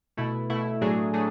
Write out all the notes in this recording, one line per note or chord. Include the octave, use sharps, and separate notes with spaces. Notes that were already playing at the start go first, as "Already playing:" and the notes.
B2 A3 E4
B2 A3 E4
A2 F#3 A3 D4 G#4
A2 F#3 A3 D4 G#4